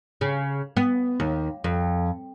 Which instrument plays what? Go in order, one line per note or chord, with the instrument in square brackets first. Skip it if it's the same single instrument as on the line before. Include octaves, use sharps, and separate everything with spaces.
[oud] C#3
B3
D#2
F2